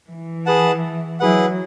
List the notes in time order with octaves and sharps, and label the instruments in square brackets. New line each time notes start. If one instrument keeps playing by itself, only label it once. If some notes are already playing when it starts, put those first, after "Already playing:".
[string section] E3
[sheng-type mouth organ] G#4 B4 F#5 A5
[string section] F#3 [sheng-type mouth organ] E4 G#4 B4 F#5